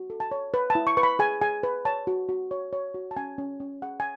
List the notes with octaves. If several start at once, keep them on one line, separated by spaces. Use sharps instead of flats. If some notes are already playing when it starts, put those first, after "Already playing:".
Already playing: F#4
A4
A5
C#5
B4
A5
E4
C#6
B4 C#6
B5
G#4 G#5
G#4 G#5
B4
C#5 A5
F#4
F#4
C#5
C#5
F#4
A5
C#4 G#5
C#4
C#4
G#4 F#5
G#5